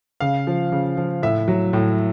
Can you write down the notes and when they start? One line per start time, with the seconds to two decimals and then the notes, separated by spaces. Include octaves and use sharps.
0.20 C#3 F5
0.47 F3
0.72 C#3
0.97 F3
1.22 A2 E5
1.48 F#3
1.73 A2